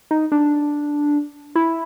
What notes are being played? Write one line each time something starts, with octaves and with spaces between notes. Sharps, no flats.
D#4
D4
E4